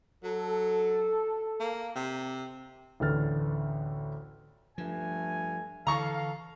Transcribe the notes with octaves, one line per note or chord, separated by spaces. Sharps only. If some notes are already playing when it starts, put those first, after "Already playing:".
F#3 A4
A#3
C3
A1 D2 D3 B4 F6 A6
G2 F3 A3 G#5
D3 E3 A4 F5 A#5 C#6